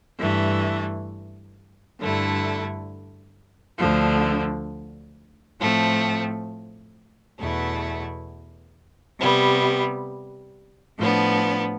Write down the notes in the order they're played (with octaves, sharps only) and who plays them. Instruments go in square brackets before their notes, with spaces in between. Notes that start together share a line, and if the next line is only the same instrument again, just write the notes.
[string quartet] G2 E3 A3
G2 D3 A3 E4
D2 D3 F3
A2 F3 A3 C4
E2 B2 A3 E4
C3 G3 B3
A2 F3 B3 D4